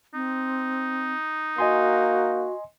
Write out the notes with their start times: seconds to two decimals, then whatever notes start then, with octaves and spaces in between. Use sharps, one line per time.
0.14 C4 D#4
1.58 A#3 F#4 D#5 G#5 C6